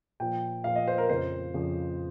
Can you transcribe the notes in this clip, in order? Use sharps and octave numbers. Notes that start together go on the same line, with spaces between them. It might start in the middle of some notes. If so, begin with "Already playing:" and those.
A#2 F3 G5
A#2 F3 F5
D#5
C5
A#4
F2 C#3 F3 C5
F2 C#3 F3